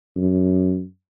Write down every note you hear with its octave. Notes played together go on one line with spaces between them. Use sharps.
F#2